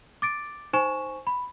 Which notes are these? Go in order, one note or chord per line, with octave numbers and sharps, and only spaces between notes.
D6 A6 D7
D#4 C5 G#5 C#6 E7
B5